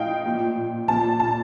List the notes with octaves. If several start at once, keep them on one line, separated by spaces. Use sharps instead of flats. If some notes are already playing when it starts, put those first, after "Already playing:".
Already playing: A2 F3 D#5 F5 G5
A#2 F3
A#2 F3 A5
A5